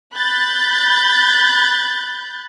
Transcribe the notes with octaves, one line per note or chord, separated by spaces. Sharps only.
B5 F#6 G6 A6